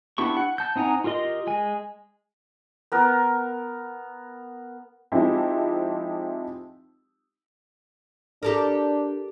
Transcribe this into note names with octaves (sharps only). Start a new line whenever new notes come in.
B3 D4 E4 G4 C#6
F#5
A5 G6
C4 D#4 F#5 G#5 A#5
F4 G4 A#4 D#5 C6
G#3 G#5
B3 A#4
F3 G#3 C4 D#4 E4 G4
D4 G4 A4 A#4